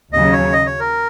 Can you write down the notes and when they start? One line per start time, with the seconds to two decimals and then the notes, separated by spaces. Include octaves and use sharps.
0.13 D#2 C#3 F#3 D#5
0.32 C#5
0.53 D#5
0.66 C#5
0.80 A#4